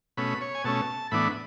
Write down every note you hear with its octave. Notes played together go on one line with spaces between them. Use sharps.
B2 A3 C#4 B5
C#5
G#5
B2 A3 C#4 A5
A2 E3 B3 D4 B5